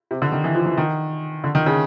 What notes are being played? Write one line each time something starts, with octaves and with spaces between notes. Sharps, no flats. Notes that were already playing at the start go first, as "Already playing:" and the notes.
C3
D3
D#3
E3
F3
E3
D#3
D3
D#3
C#3